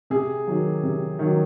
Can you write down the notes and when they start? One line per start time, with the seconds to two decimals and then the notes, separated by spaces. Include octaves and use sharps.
0.10 C3 G#4
0.47 D#3 F#3
0.83 C3
1.19 D#3 F#3